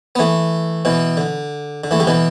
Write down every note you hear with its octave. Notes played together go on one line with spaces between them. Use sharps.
B3
E3 A3
B2 E3
D3
D3
E3 A3
D3 G3
B2 E3